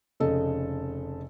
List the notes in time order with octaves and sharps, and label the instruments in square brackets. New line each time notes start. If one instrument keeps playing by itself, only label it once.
[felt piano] F1 C#3 A4 D#5